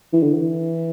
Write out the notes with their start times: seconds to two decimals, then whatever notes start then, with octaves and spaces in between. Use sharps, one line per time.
0.13 E3
0.23 D3
0.34 E3